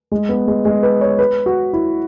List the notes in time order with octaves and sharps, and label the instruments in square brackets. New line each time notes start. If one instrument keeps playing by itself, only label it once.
[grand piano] G#3
B3
G#3
G#3
B4
C#5
B4
F#4
E4